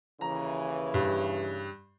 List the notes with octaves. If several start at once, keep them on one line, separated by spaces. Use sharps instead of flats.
D#2 C#3 E3 A#5
G2